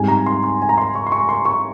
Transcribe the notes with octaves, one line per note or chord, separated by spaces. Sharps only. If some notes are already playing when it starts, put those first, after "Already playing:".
Already playing: G#2 G3 C4 G#5
A#5
C6
C6
G#5
A#5
C6
C#6
C6
C#6
C6
C#6